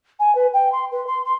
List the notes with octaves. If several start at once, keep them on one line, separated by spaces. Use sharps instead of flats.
G#5
B4
G5
C6
B4
C6
C6